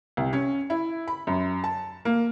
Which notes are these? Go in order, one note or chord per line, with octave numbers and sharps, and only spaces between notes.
C2
C#4
E4
B5
F#2
A5
A#3